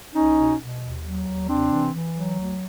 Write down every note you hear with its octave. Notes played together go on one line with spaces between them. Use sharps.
C2 C#4 D#4
B2
B2
D#2
F#3
D#2
C3 C4 D4
E3
E3
F#3
D2